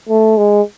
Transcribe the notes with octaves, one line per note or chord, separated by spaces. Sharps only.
A3
G#3